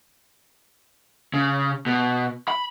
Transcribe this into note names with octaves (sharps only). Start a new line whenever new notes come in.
C#3
B2
B5